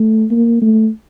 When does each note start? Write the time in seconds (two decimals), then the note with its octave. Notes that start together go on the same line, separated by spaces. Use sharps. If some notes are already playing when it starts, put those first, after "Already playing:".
Already playing: A3
0.31 A#3
0.62 A3